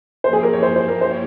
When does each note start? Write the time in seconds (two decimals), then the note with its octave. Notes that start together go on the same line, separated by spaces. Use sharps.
0.24 F3 A#3 E4 G4 C5
0.33 G#4
0.43 A#4
0.53 C#5
0.63 C5
0.76 C5
0.88 A#4
1.01 C5
1.11 C#5